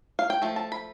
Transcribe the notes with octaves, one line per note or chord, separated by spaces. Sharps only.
F5
G5
F3 A3
A5
B5